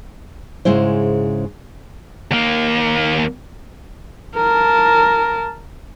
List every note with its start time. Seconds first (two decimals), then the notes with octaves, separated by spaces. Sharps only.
0.65 G#2 C#3 G#3 E4 C5
2.31 D#2 A#3
4.36 A#4 A5